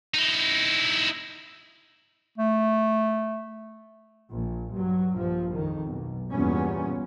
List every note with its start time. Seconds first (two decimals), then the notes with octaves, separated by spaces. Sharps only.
0.14 D#4 E4
2.38 A3
4.32 A#1
4.72 G2 F#3
5.13 A#1 G2 F3
5.52 F2 D#3
5.84 B1
6.32 E2 G2 A#2 G3 B3 C#4